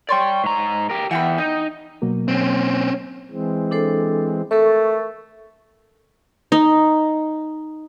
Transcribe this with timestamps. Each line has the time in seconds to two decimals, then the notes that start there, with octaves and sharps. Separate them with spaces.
0.09 C#5 D5 G5 C6 C#6
0.44 G#2 A#5
0.90 G4 A#4
1.11 E2 E3 F#5 G5 B5
1.38 D#4 G5
2.02 B2 F#3 A#3
2.28 C4 C#4
3.31 E3 G#3 C4
3.71 D4 A4 C5
4.51 A3 A4 A#4 C#6
6.52 D#4